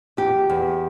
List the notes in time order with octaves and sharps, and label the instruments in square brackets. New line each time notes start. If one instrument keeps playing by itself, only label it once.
[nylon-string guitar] E2 G4
E2